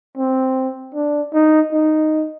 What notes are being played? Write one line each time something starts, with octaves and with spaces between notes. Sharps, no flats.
C4
D4
D#4
D#4